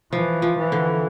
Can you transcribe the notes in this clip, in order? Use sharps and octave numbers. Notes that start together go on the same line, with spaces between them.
E3 F3
F3
E3
D3